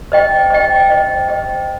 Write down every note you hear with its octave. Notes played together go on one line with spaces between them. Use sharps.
C5 D#5 G5
C5 D#5 G5
C5 D#5 G5
C5 D#5 G5